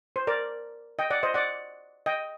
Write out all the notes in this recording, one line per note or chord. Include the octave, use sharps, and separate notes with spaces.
C5
A#4 D5
D#5 G5
D5 F#5
C5 D#5
D5 F#5
D#5 G5